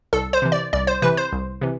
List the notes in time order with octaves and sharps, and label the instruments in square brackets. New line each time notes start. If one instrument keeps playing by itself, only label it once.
[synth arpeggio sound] C2 A4
C5
C3 E3
D5
C2 D5
C5
C3 E3 B4
C5
C2
C3 E3